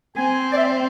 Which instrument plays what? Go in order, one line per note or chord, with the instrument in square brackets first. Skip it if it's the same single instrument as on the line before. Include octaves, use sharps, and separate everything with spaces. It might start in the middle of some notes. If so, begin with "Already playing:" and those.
[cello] C4 [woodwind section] G#5
[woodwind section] D5
E5